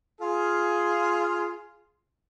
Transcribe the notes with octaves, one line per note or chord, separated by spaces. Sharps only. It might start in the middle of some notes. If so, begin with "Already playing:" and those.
F4 G#4